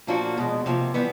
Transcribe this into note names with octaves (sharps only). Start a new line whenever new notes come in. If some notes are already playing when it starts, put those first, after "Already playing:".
A#2 F3 A#3 D4 F#4
E2 B2 G#3
C3 F3 A#3
E3 G3 B3